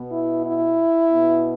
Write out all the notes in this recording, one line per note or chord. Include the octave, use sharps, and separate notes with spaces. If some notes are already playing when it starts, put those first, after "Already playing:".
Already playing: B2 B3
E4
E4
B2 B3